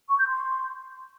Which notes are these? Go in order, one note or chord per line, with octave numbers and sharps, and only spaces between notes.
C#6
G6
C6